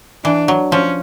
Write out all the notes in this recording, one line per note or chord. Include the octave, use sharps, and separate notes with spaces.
E3 D4
F#3
F3 C#4